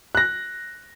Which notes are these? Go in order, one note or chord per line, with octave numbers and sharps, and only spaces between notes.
F#6 A#6